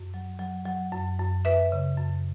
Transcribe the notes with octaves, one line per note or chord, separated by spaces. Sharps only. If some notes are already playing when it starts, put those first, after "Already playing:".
Already playing: F#2
F#3
F#3
F#3
F#2
F#2
F#2 B4 E5
C#3
F#2